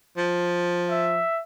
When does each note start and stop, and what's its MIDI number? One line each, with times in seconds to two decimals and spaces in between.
0.17 1.22 53
0.90 1.41 76